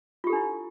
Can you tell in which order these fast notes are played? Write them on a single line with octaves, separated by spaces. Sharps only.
F4 G4 A4 D4 E4